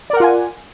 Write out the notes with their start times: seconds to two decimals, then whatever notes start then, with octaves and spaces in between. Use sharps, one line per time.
0.10 D5
0.13 A#4
0.17 F#5
0.20 F4
0.24 G#5